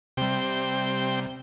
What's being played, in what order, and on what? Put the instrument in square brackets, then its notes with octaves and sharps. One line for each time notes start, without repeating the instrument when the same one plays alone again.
[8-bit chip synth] C3 G3 [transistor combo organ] C4 G5